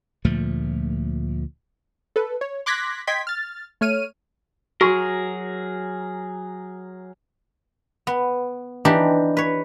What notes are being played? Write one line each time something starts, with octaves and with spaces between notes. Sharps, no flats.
D2 A#2 F3 A3
A4 B4
C#5
C6 D6 F#6 G#6 A#6 B6
D#5 G5 C6 G#6 B6
F6 A6
A3 C#5 F6 D#7
F#3 F#4 G#4 A#4 C#6
B3
E3 D4 D#4 G4
B4 C#5